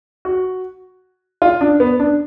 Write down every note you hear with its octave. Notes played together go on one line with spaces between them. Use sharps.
F#4
F4
D4
B3
D4